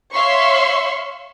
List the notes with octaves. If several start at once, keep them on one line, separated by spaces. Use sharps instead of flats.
C#5 E5 F5 C6 C#6